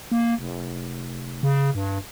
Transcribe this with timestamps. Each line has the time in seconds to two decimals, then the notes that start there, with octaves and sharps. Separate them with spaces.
0.11 A#3
0.38 F1
1.43 C#3
1.75 G2